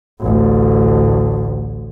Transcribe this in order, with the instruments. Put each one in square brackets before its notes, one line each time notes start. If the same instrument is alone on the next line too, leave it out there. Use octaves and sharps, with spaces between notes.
[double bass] A1 D2